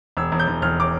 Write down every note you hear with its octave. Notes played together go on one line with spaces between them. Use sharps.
E1 E6
E1
G6
E1
E1 F6
D6